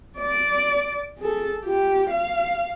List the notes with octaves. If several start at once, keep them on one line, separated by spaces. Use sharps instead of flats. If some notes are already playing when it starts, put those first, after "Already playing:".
D5
G#4 A4
F4 G4
F5